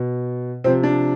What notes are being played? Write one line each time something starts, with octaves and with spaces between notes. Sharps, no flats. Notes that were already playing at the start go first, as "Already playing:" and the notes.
Already playing: B2
C3 F3 C4
D4